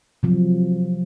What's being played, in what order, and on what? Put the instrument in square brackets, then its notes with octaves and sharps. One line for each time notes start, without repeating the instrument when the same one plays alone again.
[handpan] C3 F3 F#3